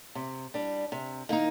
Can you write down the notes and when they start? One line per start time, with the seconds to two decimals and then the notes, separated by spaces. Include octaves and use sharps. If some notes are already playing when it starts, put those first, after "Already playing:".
0.15 C3
0.54 G3 D4
0.92 C3
1.29 D#3 A#3 D#4